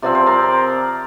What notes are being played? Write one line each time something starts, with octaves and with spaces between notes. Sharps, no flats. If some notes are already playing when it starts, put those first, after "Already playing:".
C3 F3 C4 D5
C5
A#4 D5